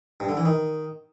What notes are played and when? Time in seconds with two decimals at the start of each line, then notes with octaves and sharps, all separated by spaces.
0.20 G2
0.29 D3
0.37 E3
0.45 D#3